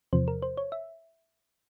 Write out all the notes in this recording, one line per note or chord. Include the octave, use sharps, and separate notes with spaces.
E2 C3 F3 C5
A#4
C5
C#5
E5